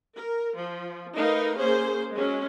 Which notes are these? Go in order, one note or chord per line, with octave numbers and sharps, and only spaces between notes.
A#4
F3
A3 D#4 A#4 B4 F5
A#3 C#4 G#4 C5
F#3 G#3 C#4